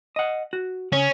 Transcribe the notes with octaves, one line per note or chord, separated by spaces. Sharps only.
D#5 F#5
F#4
C#3 C#4